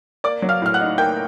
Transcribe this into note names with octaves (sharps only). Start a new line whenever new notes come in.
A#3 D5 D6
F#3
F5 F6
A2 F6
F#5 F#6
D#4
A#3 G5 G6